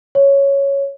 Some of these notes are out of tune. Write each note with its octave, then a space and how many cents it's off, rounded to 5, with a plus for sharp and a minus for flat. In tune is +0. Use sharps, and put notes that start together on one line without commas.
C#5 +0